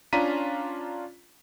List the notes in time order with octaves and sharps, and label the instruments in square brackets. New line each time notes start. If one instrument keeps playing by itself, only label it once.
[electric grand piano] C#4 D4 F4 A#5 B6 D#7